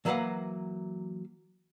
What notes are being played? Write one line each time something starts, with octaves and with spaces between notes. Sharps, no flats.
E3 F#3 A#3 B4 F5 F#5